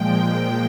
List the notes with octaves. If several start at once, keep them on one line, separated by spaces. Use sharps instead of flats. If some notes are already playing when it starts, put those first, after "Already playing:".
Already playing: A#2 F3 G#3 G5